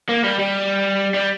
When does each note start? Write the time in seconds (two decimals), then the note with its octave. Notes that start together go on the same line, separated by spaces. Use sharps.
0.09 A#3
0.24 G3
0.39 G3
1.14 G3